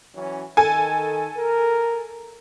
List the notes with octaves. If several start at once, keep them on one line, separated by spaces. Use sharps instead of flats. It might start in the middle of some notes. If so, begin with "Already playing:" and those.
E3 F#3 C#4
D#3 A4 G#5
A#4